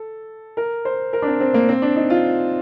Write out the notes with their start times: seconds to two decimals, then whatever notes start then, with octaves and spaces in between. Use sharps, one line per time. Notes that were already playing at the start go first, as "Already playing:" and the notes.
Already playing: A4
0.57 A#4
0.85 C5
1.13 A#4
1.22 D4
1.27 C4
1.40 C4
1.54 A#3
1.69 C4
1.82 D4
1.96 D#4
2.10 F4